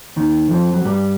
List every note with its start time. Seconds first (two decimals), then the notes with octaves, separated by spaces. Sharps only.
0.16 D#2 D#3
0.51 F2 F3
0.74 F#3
0.85 G2 G3